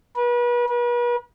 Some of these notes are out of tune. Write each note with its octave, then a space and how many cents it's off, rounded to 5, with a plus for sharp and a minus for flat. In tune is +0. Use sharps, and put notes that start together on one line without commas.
B4 -35
B4 -40